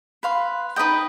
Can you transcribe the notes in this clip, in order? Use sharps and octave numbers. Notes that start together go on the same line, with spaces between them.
B4 F5 C6
D#4 B4 D#5 G5